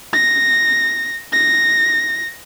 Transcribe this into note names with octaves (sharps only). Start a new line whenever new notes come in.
A#6
A#6